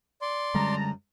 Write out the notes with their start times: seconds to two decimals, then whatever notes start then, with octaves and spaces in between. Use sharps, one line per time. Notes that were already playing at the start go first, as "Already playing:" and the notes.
0.22 D5 C6
0.54 F#2 D3 G3 G#3 A5 A#5